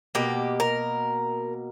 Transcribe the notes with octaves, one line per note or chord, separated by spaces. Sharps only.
B2 A#3 G4
A#4